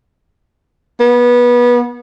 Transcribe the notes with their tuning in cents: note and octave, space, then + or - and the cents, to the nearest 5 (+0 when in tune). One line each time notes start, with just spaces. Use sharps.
B3 -25